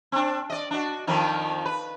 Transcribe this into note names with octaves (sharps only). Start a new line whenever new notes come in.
C4 D4
D5 D#5
D4 F#4
F2 D#3 F3
B4